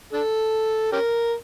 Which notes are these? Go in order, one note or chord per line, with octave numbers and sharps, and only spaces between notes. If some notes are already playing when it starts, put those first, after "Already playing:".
D4 A4
C#4 G4 A#4